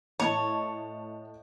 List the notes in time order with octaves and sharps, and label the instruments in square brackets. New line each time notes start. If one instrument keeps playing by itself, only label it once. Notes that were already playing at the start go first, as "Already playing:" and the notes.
[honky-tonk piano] A2 D#5 A5 [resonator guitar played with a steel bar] C#5